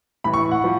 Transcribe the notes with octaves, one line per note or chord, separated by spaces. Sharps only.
A2 E3 B5
C#6
F#5
F3